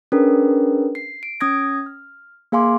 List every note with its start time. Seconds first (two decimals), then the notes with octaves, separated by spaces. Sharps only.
0.12 C#4 D4 G#4 A#4 B4
0.95 C7
1.23 D7
1.41 C#4 D#6 G#6 A#6
1.86 F6
2.52 A#3 G#4 F5 G#5 C6 D6